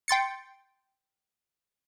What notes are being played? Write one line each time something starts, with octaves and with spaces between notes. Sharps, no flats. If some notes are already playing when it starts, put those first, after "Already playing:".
G5 C6 A6 C#7